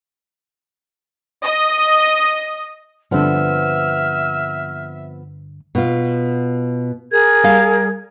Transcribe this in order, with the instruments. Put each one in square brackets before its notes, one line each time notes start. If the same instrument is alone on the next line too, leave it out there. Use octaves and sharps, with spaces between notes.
[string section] D#5
[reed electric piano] G2 D3 [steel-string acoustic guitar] F3 B3 C4 [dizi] E5 [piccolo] F6
[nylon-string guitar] B2 F4
[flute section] G#4 A#4 G#6
[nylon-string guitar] G3 F5